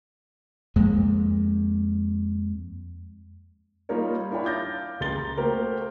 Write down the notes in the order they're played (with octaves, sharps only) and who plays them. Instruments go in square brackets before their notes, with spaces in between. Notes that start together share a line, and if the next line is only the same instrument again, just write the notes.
[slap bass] F2 G#3 A#3
[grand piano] G3 A#3 D#4 F4 A#4 C#5
D4 E4 F4 C#5 G5 B5
F5 D6 F6 G6 A6 A#6
C#2 G#3 G4 C6 A6 G7
A#5
A3 A#3 F#4 G4 A#4 C5